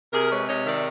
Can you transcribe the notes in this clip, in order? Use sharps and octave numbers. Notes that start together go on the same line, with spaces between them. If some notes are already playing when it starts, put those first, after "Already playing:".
C3 G#4 A#4
G#3 B4 C#5
C3 C#5 D#5
D#3 D5 E5